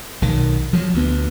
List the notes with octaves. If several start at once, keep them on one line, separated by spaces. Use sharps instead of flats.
B1 D#3
F3 F#3
D2 B3